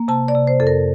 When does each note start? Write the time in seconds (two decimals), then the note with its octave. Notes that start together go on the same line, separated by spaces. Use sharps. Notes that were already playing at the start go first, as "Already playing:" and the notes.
Already playing: A#3
0.08 C3 A5
0.28 D5
0.35 C3
0.47 C5
0.60 F2 A4
0.67 A#4